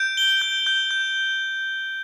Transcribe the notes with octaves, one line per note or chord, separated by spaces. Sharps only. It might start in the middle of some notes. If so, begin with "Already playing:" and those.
Already playing: G6 D7
G7
G6
G6
G6